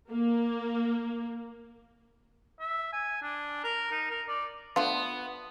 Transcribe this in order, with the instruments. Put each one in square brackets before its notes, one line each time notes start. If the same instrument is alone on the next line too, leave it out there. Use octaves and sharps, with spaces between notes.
[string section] A#3
[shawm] E5
G#5
D4
A#4
D#4
A#4
D5
[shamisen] A3 D4 F4 [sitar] B3